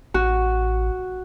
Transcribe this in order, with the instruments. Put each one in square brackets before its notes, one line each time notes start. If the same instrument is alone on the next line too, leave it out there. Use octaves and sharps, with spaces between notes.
[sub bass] A1 [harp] F#4